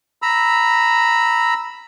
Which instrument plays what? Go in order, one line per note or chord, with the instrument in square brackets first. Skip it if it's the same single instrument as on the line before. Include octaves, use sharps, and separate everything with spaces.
[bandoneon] A#5 B5 E6